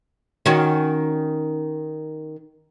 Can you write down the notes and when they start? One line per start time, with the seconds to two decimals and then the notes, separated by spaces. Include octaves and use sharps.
0.46 D#3 C#4 F#4